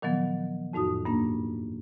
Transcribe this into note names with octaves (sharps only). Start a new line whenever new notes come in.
A#2 D#3 F3 F#3 B3
F2 A2 D#4 F#4 D#6
G2 A#3 D4